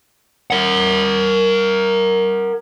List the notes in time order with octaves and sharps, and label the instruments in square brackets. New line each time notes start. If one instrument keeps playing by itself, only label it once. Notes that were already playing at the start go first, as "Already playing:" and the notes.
[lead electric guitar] A#4 F#5